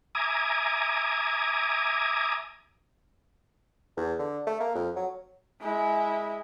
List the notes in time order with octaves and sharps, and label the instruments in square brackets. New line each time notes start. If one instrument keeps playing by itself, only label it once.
[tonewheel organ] E5 G#5 A#5 D6 D#6 G#6
[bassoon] E2
D3
A3
A#3
F2
F#3
[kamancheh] G#3 E4